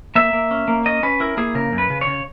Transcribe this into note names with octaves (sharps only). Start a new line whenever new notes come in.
A#3 E5
A#3
C#4
A#3
C#4 D#5
C#4 B4
E4 A#4
A#3 G#4
C#3 A#4
F#2
B4
C#3
C#5
C#3